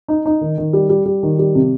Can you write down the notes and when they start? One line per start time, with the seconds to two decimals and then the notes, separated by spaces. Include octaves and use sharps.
0.08 D#4
0.26 D#4
0.41 D#3
0.58 D#3
0.73 G3
0.90 G3
1.05 G3
1.23 D#3
1.39 G3
1.55 C3